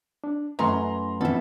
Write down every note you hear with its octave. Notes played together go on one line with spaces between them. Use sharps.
D4
F#2 E3 A3 B4 A#5 C6
F2 A#2 E3 B3 A4 E5